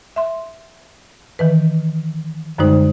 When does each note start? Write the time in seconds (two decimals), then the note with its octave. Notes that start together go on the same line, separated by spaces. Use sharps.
0.16 E5 C6
1.39 D#3 E3 B4
2.58 F#2 D3 G3 G#3 D#4 C5